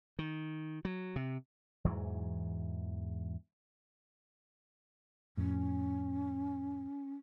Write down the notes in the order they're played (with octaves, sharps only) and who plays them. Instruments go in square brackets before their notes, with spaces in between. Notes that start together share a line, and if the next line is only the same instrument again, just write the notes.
[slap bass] D#3
F#3
C3
E2 G#2 E3 F#3
[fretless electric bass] F2 A2 [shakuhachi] C#4